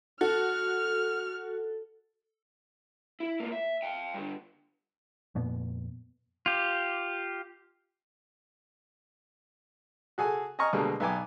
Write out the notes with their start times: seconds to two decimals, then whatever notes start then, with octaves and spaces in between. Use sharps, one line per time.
0.21 F#4 A4 F6
3.20 E4
3.40 B2 A#3
3.52 E5
3.83 F5 G5
4.14 G2 D3
5.35 F2 A#2 B3
6.46 F4 G4
10.18 F#4 G#4 A4 G#5
10.59 D#5 G#5 A#5 C#6 D#6 F6
10.73 B2 D3 G3 G#3 A#3
11.00 B1 B3 G5 G#5 D6